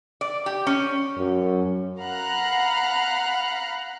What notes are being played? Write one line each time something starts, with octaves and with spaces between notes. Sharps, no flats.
D5
G4
C#4
F#2
F5 F#5 A#5 B5 F6 F#6